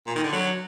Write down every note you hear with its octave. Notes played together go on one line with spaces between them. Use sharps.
A#2
D#3
D3
F#3